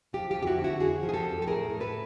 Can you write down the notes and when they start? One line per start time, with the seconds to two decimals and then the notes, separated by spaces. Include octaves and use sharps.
0.13 F3 F4 G4
0.30 F4 G4
0.36 F2
0.43 G4
0.47 E4 F#4
0.59 D3
0.64 E4 F#4
0.80 F2 F#4 G#4
1.03 F3
1.09 G#4
1.14 G4 A4
1.25 F2
1.42 A4
1.47 A2 G#4 A#4
1.70 A2
1.80 A4 B4